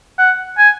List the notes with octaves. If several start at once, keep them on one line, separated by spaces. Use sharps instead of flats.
F#5
G#5